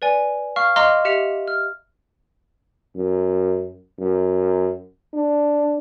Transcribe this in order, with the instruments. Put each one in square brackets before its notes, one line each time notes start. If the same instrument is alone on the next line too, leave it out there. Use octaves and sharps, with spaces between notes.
[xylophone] B4 D5 G#5
F5 C#6 F6
D#5 F5 A#5 C6 D6 F6
G4 E5 C#7 F7
F6
[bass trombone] F#2
F#2
D4